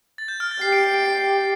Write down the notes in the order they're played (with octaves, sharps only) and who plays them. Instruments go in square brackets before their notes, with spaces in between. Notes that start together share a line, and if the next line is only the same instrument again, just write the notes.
[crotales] A6
G6
F6
A6
[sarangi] G4 [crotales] C7
[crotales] D7
D7
D7
C7